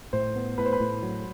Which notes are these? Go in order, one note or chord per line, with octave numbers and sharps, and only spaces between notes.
A2 C5
B3
A2 B4
C5
B4
A2
F#3